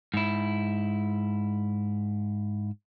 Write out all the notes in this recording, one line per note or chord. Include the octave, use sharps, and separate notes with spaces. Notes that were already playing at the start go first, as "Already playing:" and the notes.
G#2 E4